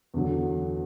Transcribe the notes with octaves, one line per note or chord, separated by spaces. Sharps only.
E2 D3 F#3